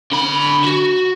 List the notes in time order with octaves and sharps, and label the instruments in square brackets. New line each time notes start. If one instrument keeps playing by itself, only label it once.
[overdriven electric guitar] D3 B5
F#4